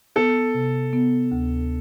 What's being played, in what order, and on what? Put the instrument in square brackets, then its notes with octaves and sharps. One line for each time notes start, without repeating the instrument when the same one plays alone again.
[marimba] B3 [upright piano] A4
[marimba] C3
B3
D2